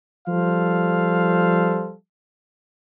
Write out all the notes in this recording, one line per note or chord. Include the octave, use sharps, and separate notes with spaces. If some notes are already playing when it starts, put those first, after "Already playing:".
F3 G3 A4 C5 F5